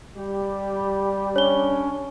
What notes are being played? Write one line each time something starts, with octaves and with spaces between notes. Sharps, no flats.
G3 G4
C#4 D4 C#5 G7